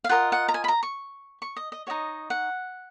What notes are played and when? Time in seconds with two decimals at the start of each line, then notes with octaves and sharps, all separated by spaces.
0.04 F5
0.09 F4 A#4 D#5 F#5
0.32 F#5
0.48 A#5
0.54 G#5
0.64 B5
0.68 A#5
0.83 C#6
1.42 C#6
1.56 D#5
1.72 D#5
1.87 D#4 F#4 C#5 D#5
2.30 F#5